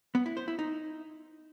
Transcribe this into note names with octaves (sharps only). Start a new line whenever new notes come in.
B3
E4
C5
E4
D#4